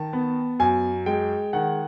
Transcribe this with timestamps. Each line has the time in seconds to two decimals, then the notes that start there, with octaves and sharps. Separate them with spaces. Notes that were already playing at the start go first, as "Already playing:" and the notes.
Already playing: D#3 A5
0.13 B3
0.60 F#2 G#5
1.06 G#3 G5
1.53 D#3 F#5